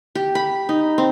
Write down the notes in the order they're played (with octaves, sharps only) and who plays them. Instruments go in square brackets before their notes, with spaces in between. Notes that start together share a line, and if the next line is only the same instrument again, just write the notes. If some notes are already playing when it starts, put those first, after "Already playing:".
[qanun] G4
B5
D#4
C4